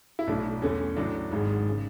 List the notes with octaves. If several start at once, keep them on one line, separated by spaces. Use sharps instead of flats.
E4
B1 A2 F#3 A3 D4
E2 D3 A3 C#4
A1 A2 F#3 D4
G#1 G#2 G#3
C#3